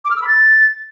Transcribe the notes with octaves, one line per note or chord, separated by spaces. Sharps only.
D6
F6
E6
B5
A6